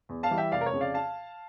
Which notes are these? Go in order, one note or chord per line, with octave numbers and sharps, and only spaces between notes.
E2
F5 A5
E3 G3
E5 G5
F1 D5 F5
A#4
C#5
F2 C#3
D5 F5
F5 A5